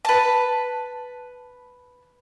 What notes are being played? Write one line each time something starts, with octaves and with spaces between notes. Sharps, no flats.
B4 A5